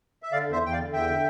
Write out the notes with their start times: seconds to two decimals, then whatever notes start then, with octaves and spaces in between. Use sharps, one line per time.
0.23 E5
0.32 D3 D5 F5
0.48 E2 C5 E5
0.63 E2 G5
0.72 D5 F5
0.78 D3
0.93 E2 E5 G5
1.09 D3